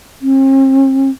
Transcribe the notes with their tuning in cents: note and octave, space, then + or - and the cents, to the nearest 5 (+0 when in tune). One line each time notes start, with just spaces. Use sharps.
C4 +45